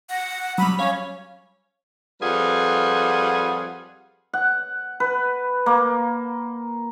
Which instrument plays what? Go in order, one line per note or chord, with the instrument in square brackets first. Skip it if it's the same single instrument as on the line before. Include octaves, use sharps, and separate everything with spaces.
[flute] F#5 [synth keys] A#6
[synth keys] F#3 G3 [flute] B5
[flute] C#4 [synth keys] C#5 F5
[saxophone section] F2 G3 F4 G#4 B4 F#5
[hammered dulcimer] F#5
B4
A#3